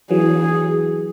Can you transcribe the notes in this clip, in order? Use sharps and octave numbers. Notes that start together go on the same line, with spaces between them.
E3 F#3 G#4